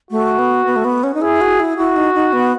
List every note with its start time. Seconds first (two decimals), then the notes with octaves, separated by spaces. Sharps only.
0.11 A3 F#4
0.39 B3
0.66 B3
0.76 A3
0.84 B3
1.04 C#4
1.14 D#4
1.21 E4 G#4
1.41 F#4
1.60 E4
1.78 E4 F#4
1.96 D#4
2.14 D#4
2.33 B3